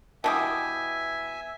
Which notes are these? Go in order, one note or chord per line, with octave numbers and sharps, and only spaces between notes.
B2 E3 G4 E5 G#5 A5 D#6